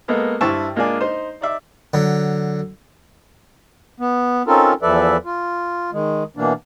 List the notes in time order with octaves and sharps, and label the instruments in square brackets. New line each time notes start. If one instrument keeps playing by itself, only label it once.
[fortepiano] G#3 A#3 B3 A4
G2 E4 C5 E5 A5 C#6
G#3 A#3 D4 F4 D5 G#5
D#4 C5
D#4 D5 E5
[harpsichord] D3 F#3
[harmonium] B3
C4 C#4 D#4 F4 A4 A#4
E2 F3 A4 B4 D5 E5
F4
D#3 G#3
B2 E3 A#3 D4